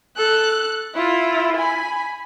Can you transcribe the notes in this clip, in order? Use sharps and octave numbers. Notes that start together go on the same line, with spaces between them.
A4 F#6
E4 F4
G#5 B5